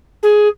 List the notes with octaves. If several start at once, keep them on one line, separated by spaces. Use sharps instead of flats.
G#4